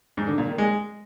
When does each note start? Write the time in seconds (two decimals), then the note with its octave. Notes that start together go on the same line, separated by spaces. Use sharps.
0.17 G#2
0.28 D3
0.38 A#2
0.48 D#3
0.58 G#3